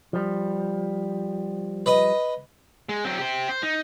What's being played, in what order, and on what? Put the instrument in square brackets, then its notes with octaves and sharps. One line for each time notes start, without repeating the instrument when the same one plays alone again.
[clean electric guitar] F3 G3
[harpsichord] B4 D#5
[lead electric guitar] G#3
F#3 C4
G4 C5
C5
D#4